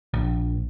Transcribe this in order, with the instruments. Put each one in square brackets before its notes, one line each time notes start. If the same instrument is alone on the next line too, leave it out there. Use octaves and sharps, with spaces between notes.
[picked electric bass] A#1